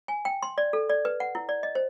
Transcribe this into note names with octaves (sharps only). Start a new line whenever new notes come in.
G#5
G5
C6
D5
A4
D5
B4
F#5
E4
D5
D#5
C5